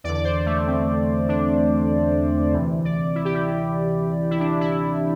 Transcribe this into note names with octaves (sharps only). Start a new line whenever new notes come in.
E2 D3 D5
D5
C5
A3
C4
D4
D2 C3 E3
D5
E4
G4
E4
E4
D4
E4